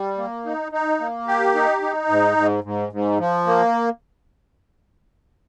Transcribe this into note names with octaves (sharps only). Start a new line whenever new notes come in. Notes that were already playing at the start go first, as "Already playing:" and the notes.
Already playing: G3
A#3
D#4
D#4
A#3
G4
D#4
D#4
G#2
G#2
G#2
G#2
F3
A#3